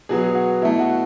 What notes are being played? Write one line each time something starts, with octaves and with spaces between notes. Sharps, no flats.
B2 F#3 B3 G#4
G#4
F#4
B2 A3 E4
F#4